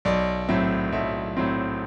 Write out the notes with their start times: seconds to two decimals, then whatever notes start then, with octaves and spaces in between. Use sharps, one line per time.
0.05 B1 D5
0.49 A2 F#3 C4 E5
0.92 B1 E5
1.37 A2 F#3 C4